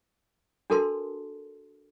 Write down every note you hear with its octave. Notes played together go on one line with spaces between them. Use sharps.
D4 F#4 A4 A#4 A5 C6